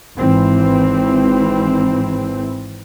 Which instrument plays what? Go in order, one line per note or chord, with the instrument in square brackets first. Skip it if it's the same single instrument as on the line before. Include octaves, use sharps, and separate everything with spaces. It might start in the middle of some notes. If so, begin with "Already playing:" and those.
[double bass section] G#1 E3 C4